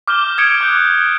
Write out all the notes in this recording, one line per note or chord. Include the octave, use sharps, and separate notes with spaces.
D6 F6 G6 E7 G7
D#6 G#6 C#7 D7
D6 D#6 F#6 G6